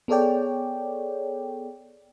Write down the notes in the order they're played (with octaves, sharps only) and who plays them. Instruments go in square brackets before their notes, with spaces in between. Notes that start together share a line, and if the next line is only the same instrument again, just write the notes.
[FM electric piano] B3 G#4 A4 C#5 D5 G5